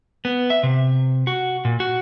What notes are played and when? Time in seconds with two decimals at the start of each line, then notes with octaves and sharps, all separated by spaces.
0.25 B3
0.50 E5
0.63 C3
1.27 F#4
1.65 A#2
1.80 F#4